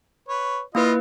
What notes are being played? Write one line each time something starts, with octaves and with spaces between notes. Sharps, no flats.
B4 C#5
A#3 E4 F4 B4 D#5